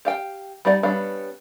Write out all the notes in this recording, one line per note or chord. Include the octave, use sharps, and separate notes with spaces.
G4 F5 G5
G3 D#4 D5 F5 F#5
G3 B3 C#4 D4 F5